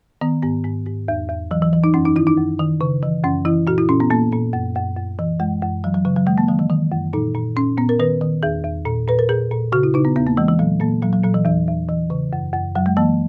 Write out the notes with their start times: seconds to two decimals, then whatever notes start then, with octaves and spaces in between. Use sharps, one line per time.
0.21 D#3 B3
0.43 G#2 B3
0.65 G#2
0.86 G#2
1.08 E2
1.30 E2
1.51 E3 F#3
1.62 E3
1.73 E3
1.84 D#4
1.94 F#2 C#4
2.05 D#4
2.16 D#3 E4
2.27 D#4
2.37 F#2
2.59 D#3
2.81 C#3
3.03 E3
3.24 F#2 C#4
3.45 E3 E4
3.67 A#2 F#4
3.78 E4
3.89 A#2 C#4
4.00 B3
4.11 A#2 A#3
4.32 A#2
4.53 F#2
4.75 F#2
4.97 F#2
5.19 E3
5.40 F#2 G#3
5.62 F#2
5.84 E3 F#3
5.94 F#3
6.05 C#3 F#3
6.16 F#3
6.26 D#3 G#3
6.38 A#3
6.48 D#3 F#3
6.59 E3
6.70 D#3
6.92 F#2
7.13 A#2 D#4
7.35 A#2
7.56 A#2 C#4
7.78 A#2 B3
7.89 A#4
7.99 D#3 B4
8.21 D#3
8.43 E2 G#4
8.64 E2
8.86 A#2
9.08 A#2 B4
9.19 A#4
9.29 A#2 G#4
9.51 A#2
9.72 C#3 F#4
9.83 E4
9.94 C#3 D#4
10.05 B3
10.16 E2 B3
10.27 A#3
10.37 E3 G#3
10.48 E3
10.59 A#2 F#3
10.80 A#2 A#3
11.02 A#2 F#3
11.13 F#3
11.24 A#2 F#3
11.34 E3
11.45 E2 E3
11.67 E2
11.89 E3
12.10 C#3
12.33 F#2
12.53 F#2
12.75 F#2 F#3
12.86 G#3
12.97 E3 A#3